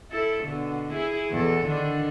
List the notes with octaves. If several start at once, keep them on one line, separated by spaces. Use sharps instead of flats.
E4 A4
B2 D3
E4 G#4
E2 B2 A4
D3 D#3 D4